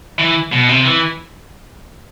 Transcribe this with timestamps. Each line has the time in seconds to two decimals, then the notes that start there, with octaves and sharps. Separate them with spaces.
0.19 E3
0.52 B2
0.69 C3
0.85 E3